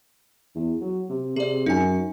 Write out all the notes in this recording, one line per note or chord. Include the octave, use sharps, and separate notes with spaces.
E2
F#3
C3
C3 G#4 D5
F#2 D#4 G#5